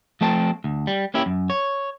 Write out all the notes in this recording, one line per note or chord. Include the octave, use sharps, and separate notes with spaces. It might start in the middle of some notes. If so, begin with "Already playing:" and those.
F3 A3 C4 A5
D2
G3
A#3 C#4 E4 G4
F#2
C#5